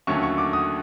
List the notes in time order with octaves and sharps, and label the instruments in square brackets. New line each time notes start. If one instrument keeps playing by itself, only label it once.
[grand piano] D#2 D3 F#3 A3 C#4 C#6
C#6
D6
D#6